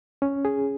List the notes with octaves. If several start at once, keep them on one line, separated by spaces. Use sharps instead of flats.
C#4
G#4